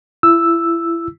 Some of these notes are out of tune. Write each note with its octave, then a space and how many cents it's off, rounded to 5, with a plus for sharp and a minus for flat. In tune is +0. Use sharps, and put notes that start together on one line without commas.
E4 +30 E6 +0